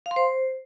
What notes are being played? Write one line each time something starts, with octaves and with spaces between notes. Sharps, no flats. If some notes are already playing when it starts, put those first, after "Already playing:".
F5
C6
C5